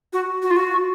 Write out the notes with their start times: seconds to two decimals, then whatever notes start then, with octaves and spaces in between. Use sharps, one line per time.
0.13 F#4
0.42 F#4
0.50 F4
0.57 F#4